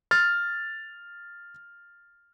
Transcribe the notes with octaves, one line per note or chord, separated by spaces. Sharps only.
F6 A6